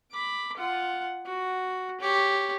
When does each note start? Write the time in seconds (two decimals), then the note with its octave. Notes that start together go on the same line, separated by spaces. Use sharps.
0.11 B5 D6
0.57 F4 F#5
1.26 F#4
2.01 G4 C#5